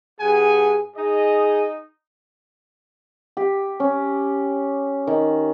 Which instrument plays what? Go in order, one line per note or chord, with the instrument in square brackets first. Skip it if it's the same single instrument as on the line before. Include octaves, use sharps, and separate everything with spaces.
[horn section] G2 F#5 G#5 [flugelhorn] G#4
[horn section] D#4 D#5 [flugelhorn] G#4
[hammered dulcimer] G4
C#4
D#3